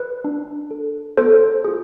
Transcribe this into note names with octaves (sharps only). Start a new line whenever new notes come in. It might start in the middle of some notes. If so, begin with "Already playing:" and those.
Already playing: B4
D4
A4
B3 A4 C5
F4 G#4